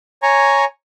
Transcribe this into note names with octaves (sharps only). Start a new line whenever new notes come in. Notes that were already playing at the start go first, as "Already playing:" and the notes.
C#5 G#5 A#5 C#6